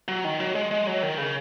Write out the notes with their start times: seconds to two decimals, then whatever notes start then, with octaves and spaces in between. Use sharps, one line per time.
0.08 F#3
0.24 D#3
0.40 F#3
0.55 G#3
0.71 G#3
0.87 F#3
1.03 D#3
1.18 C#3